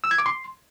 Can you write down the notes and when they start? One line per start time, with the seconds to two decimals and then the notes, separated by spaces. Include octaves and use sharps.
0.04 E6
0.11 G#6
0.18 D6
0.26 C6